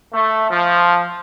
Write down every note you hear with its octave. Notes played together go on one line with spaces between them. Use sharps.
A3
F3